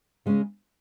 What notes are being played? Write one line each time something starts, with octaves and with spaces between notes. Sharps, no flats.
C#3 G#3 C#4